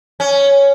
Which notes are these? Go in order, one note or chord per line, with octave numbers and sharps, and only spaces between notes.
C#4